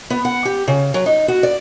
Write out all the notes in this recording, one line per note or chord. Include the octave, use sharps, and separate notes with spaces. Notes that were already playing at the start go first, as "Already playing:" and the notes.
B3
F#5
G4
C#3
F#3
D#4
F#4
D5